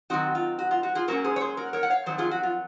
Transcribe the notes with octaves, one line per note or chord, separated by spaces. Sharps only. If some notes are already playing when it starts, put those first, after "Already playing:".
D#3 F#3 C4 D#4 F#4
F4
F#4
F4
F#4
F4 G#4
G#2 F#3 A#3 C#4 F#4 A#4
G#4 C5
C#5
G#4 C5
F#4 A#4
A#4 C#5
F#5
C#5 F5
F2 D#3 F#3 C5
F4 G#4
F#4
F4